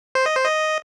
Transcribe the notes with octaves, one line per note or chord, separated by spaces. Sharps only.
C5
D#5
C5
D#5